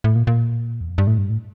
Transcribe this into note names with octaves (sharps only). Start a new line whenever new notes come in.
A2
A#2
A#2
E2
F2
G2
A2
G2
A2